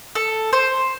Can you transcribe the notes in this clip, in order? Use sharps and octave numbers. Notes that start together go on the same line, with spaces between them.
A4
C5